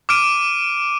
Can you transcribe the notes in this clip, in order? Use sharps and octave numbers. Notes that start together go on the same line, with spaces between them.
D6 F6 D7 D#7